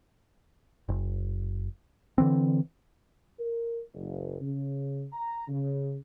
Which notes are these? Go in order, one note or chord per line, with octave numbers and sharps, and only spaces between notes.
F#1
D3 E3 C4
A#4
F#1
C#3
A#5
C#3